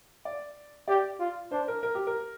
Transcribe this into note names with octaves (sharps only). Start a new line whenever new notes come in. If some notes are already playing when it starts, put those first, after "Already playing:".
D5
G4 D5
F4
D4 C5
A#4
A#4
G4
A#4